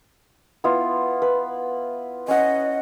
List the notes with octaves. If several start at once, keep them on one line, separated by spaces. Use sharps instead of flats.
B3 E4 F4
B4
C#4 D#5 F#5